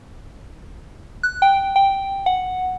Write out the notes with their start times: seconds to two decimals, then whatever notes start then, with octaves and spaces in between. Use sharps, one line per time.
1.23 F#6
1.42 G5
1.76 G5
2.26 F#5